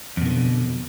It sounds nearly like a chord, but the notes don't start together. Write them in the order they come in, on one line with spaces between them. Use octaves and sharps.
F2 B2 D#3 D3